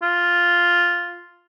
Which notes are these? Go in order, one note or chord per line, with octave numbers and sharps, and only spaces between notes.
F4